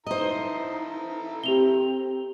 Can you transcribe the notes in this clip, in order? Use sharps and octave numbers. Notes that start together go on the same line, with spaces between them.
D#4 E4 A4 C5 D#5 A#5
C4 G4 F7 G7